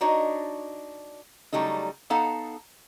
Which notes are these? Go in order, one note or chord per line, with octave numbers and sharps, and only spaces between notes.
D4 D#4 F#4 C#5 D#5
C#3 F#3 G3 A3 D#4
B3 D#4 A4 F5 F#5 A5